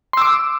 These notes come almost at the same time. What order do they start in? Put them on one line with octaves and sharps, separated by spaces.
C6 E6 D6